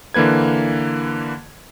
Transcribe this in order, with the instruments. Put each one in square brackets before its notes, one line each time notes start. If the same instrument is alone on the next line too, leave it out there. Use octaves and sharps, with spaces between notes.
[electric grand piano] D3 E3 A#3 B4 G#6